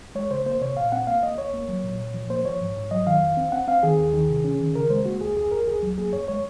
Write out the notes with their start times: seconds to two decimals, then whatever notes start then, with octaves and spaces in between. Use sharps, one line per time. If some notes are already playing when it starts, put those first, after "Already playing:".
0.15 G#3 C#5
0.30 C#3 C5
0.46 A#3 C5
0.61 C3 C#5
0.77 A#2 F5
0.92 C4 F#5
1.07 A#3 F5
1.23 A#3 D#5
1.38 C#2 C#5
1.53 A#3
1.68 F#3
1.84 A#2
1.99 A#2
2.14 F3
2.30 A#3 C5
2.45 F3 C#5
2.61 G#2
2.76 G#2
2.91 F#3 D#5
3.06 D#3 F5
3.22 F2
3.37 C4
3.52 C4 F#5
3.68 C4 F5
3.83 D#3 G#4
3.99 D#2
4.14 D#3
4.29 C3
4.44 C#4
4.59 D#3
4.75 C#3 A#4
4.90 G#3 C5
5.05 A#3 F#4
5.21 C#2 G#4
5.37 F2 G#4
5.52 F2 A#4
5.67 C#2 G#4
5.83 F#3
5.98 A#3 G#4
6.13 F#2 C#5
6.28 G#3 C#5